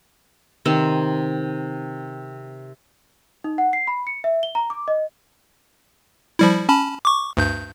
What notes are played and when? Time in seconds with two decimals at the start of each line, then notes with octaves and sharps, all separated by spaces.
0.66 C3 D#3 C4
3.44 D#4
3.58 F#5
3.73 C7
3.87 B5
4.07 C#7
4.24 E5
4.43 G7
4.55 A#5
4.70 D6
4.88 D#5
6.39 F3 G3 E4
6.69 C#4 A5 B5
7.05 C#6 D6
7.37 D2 G2 G6